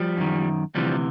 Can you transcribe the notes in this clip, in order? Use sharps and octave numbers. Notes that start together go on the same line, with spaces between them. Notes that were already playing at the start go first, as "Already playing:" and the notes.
Already playing: F3 G3
F#2 D#3
D2 C3 E3 F3 G3